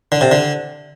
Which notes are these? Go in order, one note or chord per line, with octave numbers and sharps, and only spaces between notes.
D3
C3
D3